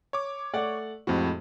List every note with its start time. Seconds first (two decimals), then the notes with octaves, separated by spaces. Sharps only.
0.13 C#5 D6
0.53 A3 D5 F#5
1.07 F2 A2 G#3 C4 F#4